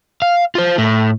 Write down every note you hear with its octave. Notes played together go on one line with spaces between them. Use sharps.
F5
F4 C5
A2